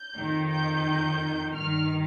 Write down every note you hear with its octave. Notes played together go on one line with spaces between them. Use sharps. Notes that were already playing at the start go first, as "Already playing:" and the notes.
Already playing: G6
F2 D#3
G6
G2 D#3 F6